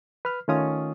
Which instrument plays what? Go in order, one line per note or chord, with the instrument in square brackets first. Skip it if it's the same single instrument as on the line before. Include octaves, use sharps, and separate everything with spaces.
[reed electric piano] B4 F6
D#3 A3 C#4 F4 D#6